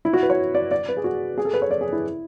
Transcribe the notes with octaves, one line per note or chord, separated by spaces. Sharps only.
E4
F#4
B4
C#5
D5
D5
B4
G#4
F#4
G#4
A4
B4
C#5
D5
G#4
E4